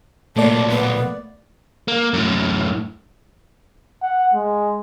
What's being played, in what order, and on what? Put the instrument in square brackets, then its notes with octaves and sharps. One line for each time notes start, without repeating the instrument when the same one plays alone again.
[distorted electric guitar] B1 A#2 [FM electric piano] A3 A#3 D5 [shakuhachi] A5
[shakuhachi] B3
[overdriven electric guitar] A#3
F#2 A2
[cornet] F#5
G#3